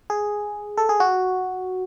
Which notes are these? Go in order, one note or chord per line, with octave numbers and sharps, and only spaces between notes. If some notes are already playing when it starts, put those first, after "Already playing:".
G#4
A4
G#4
F#4